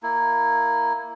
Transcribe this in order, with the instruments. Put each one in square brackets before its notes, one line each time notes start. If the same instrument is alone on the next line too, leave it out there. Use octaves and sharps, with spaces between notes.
[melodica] A#3 E4